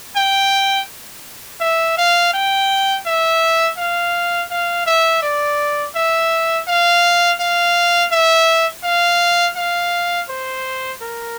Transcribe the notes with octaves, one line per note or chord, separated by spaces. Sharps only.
G5
E5
F5
G5
E5
F5
F5
E5
D5
E5
F5
F5
E5
F5
F5
C5
A#4